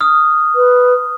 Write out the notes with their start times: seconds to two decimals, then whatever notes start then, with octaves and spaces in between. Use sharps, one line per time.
0.01 D#6 F6
0.55 B4